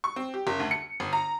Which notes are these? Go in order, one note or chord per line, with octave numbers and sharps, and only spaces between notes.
C#6
C4
G4
F#1
D2
C#7
G1
A#5